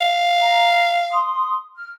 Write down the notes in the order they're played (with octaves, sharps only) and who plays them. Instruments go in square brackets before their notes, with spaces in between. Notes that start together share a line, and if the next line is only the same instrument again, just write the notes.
[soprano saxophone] F5
[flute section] A#5
C6 D#6
F6